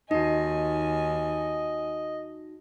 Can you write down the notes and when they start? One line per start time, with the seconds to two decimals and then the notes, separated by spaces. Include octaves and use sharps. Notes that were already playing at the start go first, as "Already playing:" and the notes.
0.11 D#2 D#4 F#4 D#5 G#5